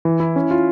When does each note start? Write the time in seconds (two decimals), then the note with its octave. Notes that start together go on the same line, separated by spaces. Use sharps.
0.05 E3
0.20 E4
0.36 C#4
0.51 F4